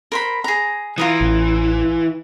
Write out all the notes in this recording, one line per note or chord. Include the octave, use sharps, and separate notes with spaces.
A#4 C5 B5
G#4 A#5
E3 F4 A#5 D#6
A1